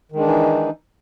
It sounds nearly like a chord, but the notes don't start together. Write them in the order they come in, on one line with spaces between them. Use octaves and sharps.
D#3 G#3 D4 E3 D#4